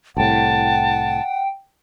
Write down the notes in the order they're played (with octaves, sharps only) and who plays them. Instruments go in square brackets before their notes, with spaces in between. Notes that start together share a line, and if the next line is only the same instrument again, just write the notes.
[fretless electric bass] C2 A2 [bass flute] F#5 [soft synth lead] G5 [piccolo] A5